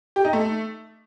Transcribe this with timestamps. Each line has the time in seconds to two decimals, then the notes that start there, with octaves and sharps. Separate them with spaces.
0.16 G4
0.25 D#4
0.33 A3